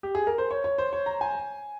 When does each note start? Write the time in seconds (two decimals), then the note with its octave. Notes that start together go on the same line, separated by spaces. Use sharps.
0.03 G4
0.15 G#4
0.27 A#4
0.38 C5
0.51 C#5
0.64 C#5
0.78 C5
0.93 C#5
1.06 A#5
1.21 G#5